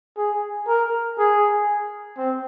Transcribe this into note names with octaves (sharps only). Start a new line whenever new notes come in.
G#4
A#4
G#4
C4